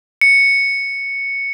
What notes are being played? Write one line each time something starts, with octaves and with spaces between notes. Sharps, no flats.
C#7